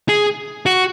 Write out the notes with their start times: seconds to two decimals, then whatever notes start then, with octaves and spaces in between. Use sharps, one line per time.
0.09 G#4
0.66 F#4